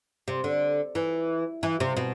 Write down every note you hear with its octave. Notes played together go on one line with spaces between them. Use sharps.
C3
D3
E3
E3
C3
B2